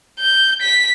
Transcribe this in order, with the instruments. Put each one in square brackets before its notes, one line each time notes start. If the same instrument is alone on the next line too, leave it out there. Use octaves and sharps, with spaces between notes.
[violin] G6
B6